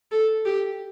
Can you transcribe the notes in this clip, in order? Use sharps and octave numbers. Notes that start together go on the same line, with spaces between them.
A4
G4